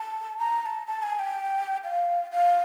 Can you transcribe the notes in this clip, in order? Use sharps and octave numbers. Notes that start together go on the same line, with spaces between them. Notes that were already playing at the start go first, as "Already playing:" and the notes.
Already playing: A5
A#5
A#5
A5
A5
G#5
G5
F5
F5